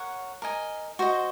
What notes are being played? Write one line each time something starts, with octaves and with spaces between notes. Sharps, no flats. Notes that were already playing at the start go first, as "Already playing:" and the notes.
Already playing: A#4 C#5 F#5
A#4 D#5 G#5
F#4 C5 D#5